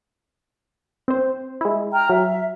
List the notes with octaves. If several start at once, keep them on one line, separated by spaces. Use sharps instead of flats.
C4 C5
G#3 E4
G5 A#5 F6
F#3 E5